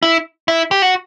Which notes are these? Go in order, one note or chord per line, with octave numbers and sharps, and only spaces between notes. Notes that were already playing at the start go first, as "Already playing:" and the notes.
E4
E4
G4
F#4